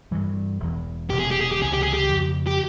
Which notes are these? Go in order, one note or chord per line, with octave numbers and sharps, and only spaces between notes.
G2 E3 G3
E1 E2 E3
E1 E2 C3 G4
G#4
G4
G#4
G4
C#2 C3 E3 G#4
G4
G#4
G4
F2 C#3 F3
G4